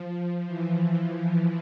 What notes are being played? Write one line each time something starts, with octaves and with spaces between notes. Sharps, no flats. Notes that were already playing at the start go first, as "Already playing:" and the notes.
Already playing: F3
F3
E3
E3